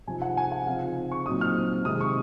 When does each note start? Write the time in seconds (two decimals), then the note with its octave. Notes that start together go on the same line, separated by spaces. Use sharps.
0.07 C3 F3 C4 D#4 G#5
0.22 F#5
0.37 G#5
0.52 F#5
0.67 C#3 F3 C4 D#4 F5
1.12 C#6
1.26 A#2 F#3 C4 D#4 D#6
1.41 F6
1.85 C3 D#3 G#3 D#4 D#6
2.01 C#6